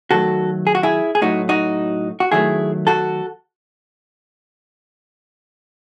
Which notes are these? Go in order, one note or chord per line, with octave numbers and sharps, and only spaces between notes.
D#3 F#3 A3 F#4 A4
G#4
F#4
E4 G#4
G#4
A2 F#3 A3 D#4 F#4
D#4 F#4
F#4
D#3 F#3 A3 E4 G#4
F#4 A4